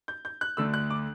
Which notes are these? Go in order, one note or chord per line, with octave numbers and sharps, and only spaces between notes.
G6
G6
F#6
D2 D3 A3 E6
F#6
D6